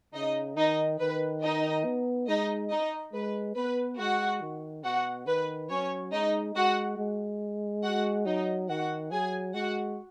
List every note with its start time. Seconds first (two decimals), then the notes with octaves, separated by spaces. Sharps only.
0.14 C#3 D#4 D#5
0.56 D#3 D#4 D#5
0.99 D#3 B4
1.42 D#4 D#5
1.85 B3
2.27 G#3 D#4 D#5
2.70 D#4 D#5
3.13 G#3 B4
3.56 B3 B4
3.98 G#3 F#4 F#5
4.41 D#3
4.84 B2 F#4 F#5
5.26 D#3 B4
5.70 F#3 C#4 C#5
6.12 G#3 D#4 D#5
6.55 G#3 F#4 F#5
6.97 G#3
7.83 F#4 F#5
8.26 F#3 D#4 D#5
8.69 D#3 F#4 F#5
9.11 F#3 G#4 G#5
9.54 G#3 F#4 F#5